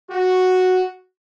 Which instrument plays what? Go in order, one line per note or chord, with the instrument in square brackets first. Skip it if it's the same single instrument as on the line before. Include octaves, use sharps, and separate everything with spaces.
[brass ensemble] F#4